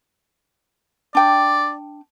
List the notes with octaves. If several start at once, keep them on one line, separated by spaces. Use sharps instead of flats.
D4 D5 G5